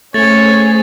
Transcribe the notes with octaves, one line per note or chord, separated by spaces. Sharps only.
A3 C#4 G#4 C5 C#5 A6